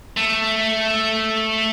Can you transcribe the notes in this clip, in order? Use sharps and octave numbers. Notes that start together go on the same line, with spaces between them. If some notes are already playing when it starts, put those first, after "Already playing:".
A3